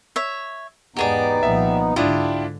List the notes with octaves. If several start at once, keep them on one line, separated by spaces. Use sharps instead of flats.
C#5 E5
E2 G#2 B3 D#4 G4 G#4 D5
C2 A#2 F3 E5
G#2 D3 D4 E4 F4 G4 D#6